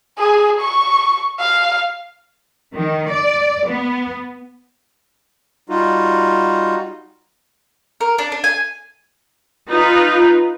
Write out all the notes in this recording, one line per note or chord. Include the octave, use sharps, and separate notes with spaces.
G#4
C#6
F5
D#3
D5
B3
G3 D#4 F4 F#4
A#4
D4
D4
G#5
D#4 F4 B4